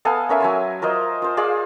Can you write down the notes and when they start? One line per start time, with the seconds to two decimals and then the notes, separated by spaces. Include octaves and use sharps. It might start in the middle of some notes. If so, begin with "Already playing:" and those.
0.05 B3 A4 F5 G#5
0.29 C#4 A#4 E5 G#5
0.40 F#3 G#5 C6
0.82 F4 A#4 C5 D#5
1.22 F4 C5
1.37 F4 G#4 D5 F5